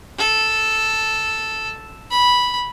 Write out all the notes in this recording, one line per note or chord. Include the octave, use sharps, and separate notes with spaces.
A4
B5